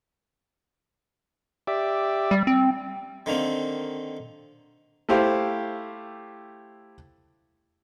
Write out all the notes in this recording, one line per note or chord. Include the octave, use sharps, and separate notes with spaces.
G4 D5 E5
G3
C4
D3 D#3 A#3 C4
A3 E4 G4 C5 F5